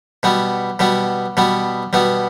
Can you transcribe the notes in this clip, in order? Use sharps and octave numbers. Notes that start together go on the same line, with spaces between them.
B2 G3 B3
B2 G3 B3
B2 G3 B3
B2 G3 B3